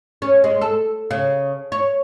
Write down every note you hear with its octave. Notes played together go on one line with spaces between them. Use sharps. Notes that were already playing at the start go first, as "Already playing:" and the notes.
C#4
G#3
A4
C#3
C#5